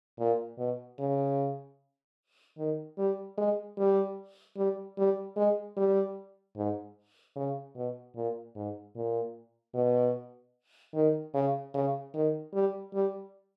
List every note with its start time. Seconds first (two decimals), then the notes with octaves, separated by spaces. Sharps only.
0.19 A#2
0.58 B2
0.99 C#3
2.58 D#3
2.98 G3
3.38 G#3
3.78 G3
4.57 G3
4.98 G3
5.36 G#3
5.77 G3
6.57 G#2
7.36 C#3
7.76 B2
8.15 A#2
8.56 G#2
8.96 A#2
9.75 B2
10.94 D#3
11.34 C#3
11.74 C#3
12.14 D#3
12.54 G3
12.94 G3